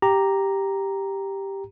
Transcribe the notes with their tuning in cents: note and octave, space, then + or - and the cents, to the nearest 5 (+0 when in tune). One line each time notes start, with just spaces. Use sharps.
G4 +0 A#5 +0